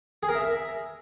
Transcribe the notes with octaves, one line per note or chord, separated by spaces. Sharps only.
G#4
A#4
E5